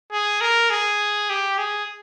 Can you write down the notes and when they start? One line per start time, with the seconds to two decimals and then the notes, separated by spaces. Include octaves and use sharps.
0.12 G#4
0.41 A#4
0.70 G#4
1.30 G4
1.58 G#4